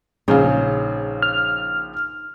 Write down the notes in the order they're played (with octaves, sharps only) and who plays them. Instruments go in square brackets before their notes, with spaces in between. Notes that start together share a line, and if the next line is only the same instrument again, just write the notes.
[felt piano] A#1 C#3 F5 [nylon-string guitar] D#4 G#4 C#5
[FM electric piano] F6